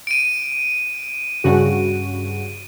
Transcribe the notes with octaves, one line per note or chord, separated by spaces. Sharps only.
D7 D#7
G2 C#3 F#4